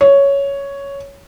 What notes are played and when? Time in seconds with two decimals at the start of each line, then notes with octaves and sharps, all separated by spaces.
0.01 C#5